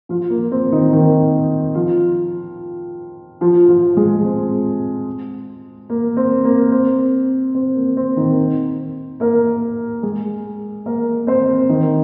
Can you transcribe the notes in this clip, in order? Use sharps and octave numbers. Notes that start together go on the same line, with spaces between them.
F3 F4
A#3
C4
D#3 D#4
D#3 D#4
F3 F4
F3 F4
F3 F4
G#3 G#4
C4
A#3
C4
A#3
C4
C4
A#3
C4
D#3 D#4
A#3 A#4
G#3 G#4
A#3 A#4
C4 C5
D#3 D#4